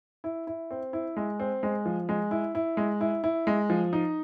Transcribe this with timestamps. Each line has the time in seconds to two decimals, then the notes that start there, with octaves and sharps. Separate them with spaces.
0.24 E4
0.47 E4
0.71 C4
0.93 E4
1.17 G#3
1.40 C4
1.63 G#3
1.85 F3
2.09 G#3
2.31 E4
2.55 E4
2.77 G#3
3.01 E4
3.24 E4
3.47 G#3
3.70 F3
3.93 D#4